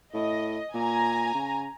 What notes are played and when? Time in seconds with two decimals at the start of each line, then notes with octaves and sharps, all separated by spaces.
0.14 A2 D#5
0.74 A#2 G#5 A#5
1.35 C#3